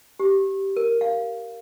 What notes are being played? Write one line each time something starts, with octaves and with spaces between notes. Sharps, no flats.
G4
A#4
F5